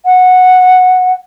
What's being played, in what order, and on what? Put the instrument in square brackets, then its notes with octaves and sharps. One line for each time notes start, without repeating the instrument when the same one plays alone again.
[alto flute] F#5